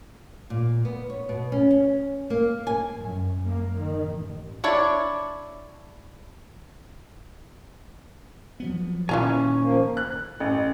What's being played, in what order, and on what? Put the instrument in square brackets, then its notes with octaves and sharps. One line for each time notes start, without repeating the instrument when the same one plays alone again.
[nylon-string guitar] A#2
B3
C#5
B2
C#4
C#4
A#3
G#5
[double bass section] F#2
A#3
D#3
A1
[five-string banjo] D4 E4 C#5 D5
[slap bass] F3 F#3 B3
[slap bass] A#2 D#3 [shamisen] E3 F4 A#5 [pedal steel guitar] C#4 G#5
[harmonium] F3 A#3
[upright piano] F#6
A1